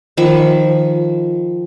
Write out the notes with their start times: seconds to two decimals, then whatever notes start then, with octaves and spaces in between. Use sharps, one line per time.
0.17 D#3 F3 B5 C#6